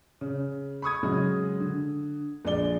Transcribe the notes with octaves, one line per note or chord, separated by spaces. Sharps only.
C#3
B5 C#6 D#6 G#6
C#3 F#3 G#3
D3
A#1 G#3 D5 G7